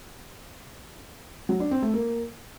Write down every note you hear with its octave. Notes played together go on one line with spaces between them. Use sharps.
F#3
D4
C4
A3
A#3